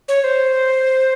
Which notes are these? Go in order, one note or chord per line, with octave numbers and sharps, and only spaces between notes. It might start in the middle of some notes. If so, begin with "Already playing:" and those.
C#5
C5